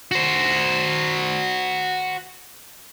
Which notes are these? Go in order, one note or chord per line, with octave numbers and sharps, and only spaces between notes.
F#4 C5